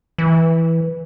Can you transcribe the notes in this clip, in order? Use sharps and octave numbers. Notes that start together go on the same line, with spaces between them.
E3